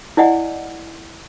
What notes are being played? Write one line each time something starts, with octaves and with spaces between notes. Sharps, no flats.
E4 D5 D#5 F#5 G#5